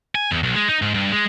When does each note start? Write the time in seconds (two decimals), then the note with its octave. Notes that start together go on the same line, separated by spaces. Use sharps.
0.15 G#5
0.31 E2
0.43 B1
0.56 G#3
0.68 D#4
0.82 G#2
0.94 G2
1.12 G#3